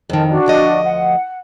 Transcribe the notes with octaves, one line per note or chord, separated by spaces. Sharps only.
F2 D#3 A#4 A5
D4 F#4
D2 F3 D#5
F#5